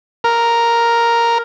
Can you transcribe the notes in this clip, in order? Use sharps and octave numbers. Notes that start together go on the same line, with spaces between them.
A#4